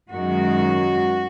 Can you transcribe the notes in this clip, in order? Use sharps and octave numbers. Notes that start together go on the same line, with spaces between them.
F#2 D#3 G#3 F#4